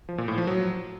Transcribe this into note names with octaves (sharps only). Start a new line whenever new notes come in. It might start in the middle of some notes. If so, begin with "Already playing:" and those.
F3
A#2
A2
F3
F#3